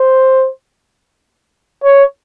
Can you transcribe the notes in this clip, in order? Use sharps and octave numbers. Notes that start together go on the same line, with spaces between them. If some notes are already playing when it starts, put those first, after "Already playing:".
Already playing: C5
C#5